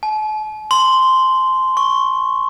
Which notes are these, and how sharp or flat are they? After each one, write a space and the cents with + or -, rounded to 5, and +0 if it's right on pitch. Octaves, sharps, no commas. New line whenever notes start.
A5 -45
C6 -5
C#6 -10